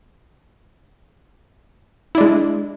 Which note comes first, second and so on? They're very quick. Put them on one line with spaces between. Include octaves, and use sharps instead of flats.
E4 D4 G#3